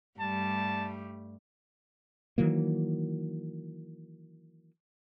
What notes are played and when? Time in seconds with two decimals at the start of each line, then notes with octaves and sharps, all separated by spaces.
0.20 G2 G3 A3 A5
2.38 D#3 E3 F#3 A#3